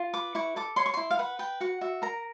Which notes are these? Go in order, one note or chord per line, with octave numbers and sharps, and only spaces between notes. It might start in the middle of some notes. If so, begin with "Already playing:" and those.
Already playing: F4
B4 D6
E4 C#6
A4 D6
C#5 C6
C#6
E4 C6
F5
B4 F#5
B4 G5
F#4 F#5
F#4 E5
A#4 A#5